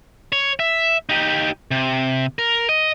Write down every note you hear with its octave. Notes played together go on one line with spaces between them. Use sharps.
C#5
E5
D#4 G4
C3
A#4
D#5